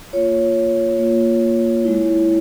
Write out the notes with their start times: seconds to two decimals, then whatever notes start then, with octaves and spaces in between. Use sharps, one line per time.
0.13 A#3 F4 C#5
0.99 A#3 F4
1.84 G#3 E4